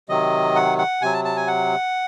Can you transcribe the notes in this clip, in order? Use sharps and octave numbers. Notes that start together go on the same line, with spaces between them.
C3 D#3 F#3 D#5
F#5
F#5
C3 F#3 G#5
A5
A5
G#5
F#5